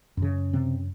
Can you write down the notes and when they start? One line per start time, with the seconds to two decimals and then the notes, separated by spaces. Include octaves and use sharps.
0.17 F#2
0.22 C#3
0.53 C3 C4